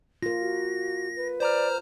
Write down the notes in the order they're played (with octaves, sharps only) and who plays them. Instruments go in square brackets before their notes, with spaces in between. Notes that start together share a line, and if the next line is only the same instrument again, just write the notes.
[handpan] F4 A#4 [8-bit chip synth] A#6
[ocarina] F#4
B4
[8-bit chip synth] C5 A#5 F6 [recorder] D5